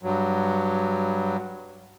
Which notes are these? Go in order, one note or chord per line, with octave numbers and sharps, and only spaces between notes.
G2 F#3